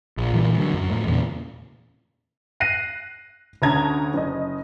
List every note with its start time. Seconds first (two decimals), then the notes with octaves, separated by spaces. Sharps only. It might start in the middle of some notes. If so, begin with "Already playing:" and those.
0.17 A#1
0.33 A#2 E3 F3 G3
0.58 D3 F#3
0.74 F#2
0.90 F2 A2
1.06 E2 A#2 C#3
2.60 F#6 A#6 C7 D#7
3.62 D2 C#4 A5 A#5 D#6 G#6
4.14 F#1 D#5